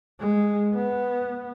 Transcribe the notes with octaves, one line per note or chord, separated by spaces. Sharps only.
G#3
B3